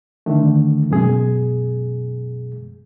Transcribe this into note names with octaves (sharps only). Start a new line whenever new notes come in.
D3 D#3 A3
F#2 B2 G#3 G#4